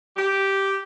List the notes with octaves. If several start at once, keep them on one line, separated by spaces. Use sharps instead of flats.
G4